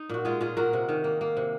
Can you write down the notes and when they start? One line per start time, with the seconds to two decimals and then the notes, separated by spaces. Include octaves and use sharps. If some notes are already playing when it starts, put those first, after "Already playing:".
Already playing: D#4
0.09 A#2 F#4
0.25 G#3 F4 G#4
0.41 A#2 F4 G#4
0.57 A#2 F#4 A#4
0.73 C3
0.89 D#3
1.04 A#3
1.21 A#3
1.37 C3